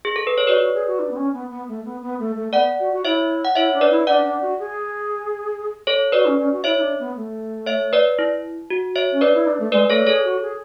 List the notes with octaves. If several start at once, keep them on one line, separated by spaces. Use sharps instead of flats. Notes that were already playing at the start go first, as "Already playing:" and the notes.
G#4
A4
B4
C#5
F#4 B4 D5
F#4
G#4
F#4
D4
B3
C#4
B3
B3
A3
B3
B3
A3
A3
B3 D5 F#5
F#4
F#4
E4 C#5 E5
F#5
E4 C#5 E5
D4
B4 D5
E4
D4 D5 F#5
D4
F#4
G#4
A4 C#5
F#4 B4 D5
C#4
C#4
F#4
E4 C#5 E5
E4
D4
B3
A3
C#5 E5
B4 D5
E4
F#4
C#5 E5
C#4
D4 B4 D5
E4
D4
A3
G#3 B4 D5
A3 A4 C#5
G#4 A4 C#5
F#4
G#4